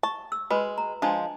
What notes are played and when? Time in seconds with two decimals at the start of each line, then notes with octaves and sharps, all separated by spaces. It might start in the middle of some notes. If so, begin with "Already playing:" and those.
0.03 A5 C#6
0.32 E6
0.50 G#3 F#4 B4 B5
0.78 A#5
1.02 F3 G#3 D4 D#5 A5